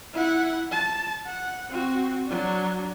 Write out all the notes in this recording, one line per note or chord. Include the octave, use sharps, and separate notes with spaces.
E4 F#5
A5
F#5
C4 F#4
F#3 D4